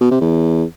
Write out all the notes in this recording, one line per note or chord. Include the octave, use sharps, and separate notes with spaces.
B2
C3
E2